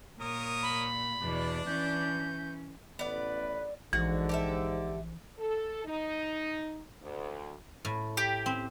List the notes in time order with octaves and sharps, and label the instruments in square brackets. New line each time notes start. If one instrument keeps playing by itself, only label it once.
[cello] A#2 [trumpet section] A#4 C#5 D#6
[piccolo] B5
[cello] E2 B2 [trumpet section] D4 D5
[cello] E3 C#4 [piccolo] G6
[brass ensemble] A1 B4 [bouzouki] B3 D5
[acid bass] A#1 [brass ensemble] G#2 D3 [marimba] E3 [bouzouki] F#4
[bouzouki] G4 A4 E5
[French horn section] A4
D#4
D2
[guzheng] A2
[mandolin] G4
[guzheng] C4